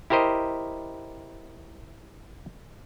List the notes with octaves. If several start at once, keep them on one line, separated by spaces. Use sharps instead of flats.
E4 G4 A#4 C5 D#5